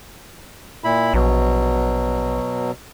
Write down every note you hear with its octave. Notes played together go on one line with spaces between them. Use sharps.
A#2 E4 B5
A#1 B2 F#3